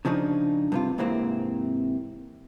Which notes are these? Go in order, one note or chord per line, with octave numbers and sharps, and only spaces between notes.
C#3 F3 D4 D#4
G2 C3 F4
G#2 C3 E3 A#3 C4